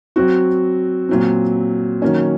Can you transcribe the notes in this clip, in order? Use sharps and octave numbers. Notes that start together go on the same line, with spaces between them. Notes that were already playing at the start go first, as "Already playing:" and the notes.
F#3 C4 F#4
A#2 F#3 C4
D#3 F#3 A#3 C#4